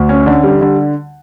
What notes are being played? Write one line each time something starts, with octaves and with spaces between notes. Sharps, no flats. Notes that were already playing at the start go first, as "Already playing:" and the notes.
Already playing: D2
C#4
D3
G3
D3